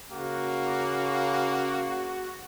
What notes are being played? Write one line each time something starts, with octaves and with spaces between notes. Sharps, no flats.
C#3 A#3 F#4